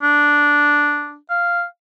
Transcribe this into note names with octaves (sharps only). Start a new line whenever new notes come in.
D4
F5